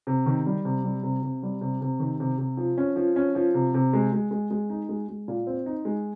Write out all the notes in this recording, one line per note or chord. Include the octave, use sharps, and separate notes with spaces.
C3
D#3
G3
C3
G3
C3
C3
G3
C3
C3
D#3
C3
C3
F3
C#4
F3
C#4
F3
C3
C3
G#3
G#3
G#3
G#3
D#4
G#3
G#3
A#2
C4
D#4
G#3